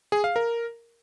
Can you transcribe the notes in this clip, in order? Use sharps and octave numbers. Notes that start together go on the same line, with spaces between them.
G#4
F5
A#4